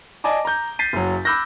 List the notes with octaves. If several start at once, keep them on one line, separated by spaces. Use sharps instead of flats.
D5 D#5 G#5 A5 D6
A#5 G6
G6 A6 B6 C7 D#7
F#1 F#3
B5 D6 E6 F#6 G6 A#6